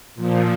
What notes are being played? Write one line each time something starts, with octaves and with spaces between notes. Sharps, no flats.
A#2 F3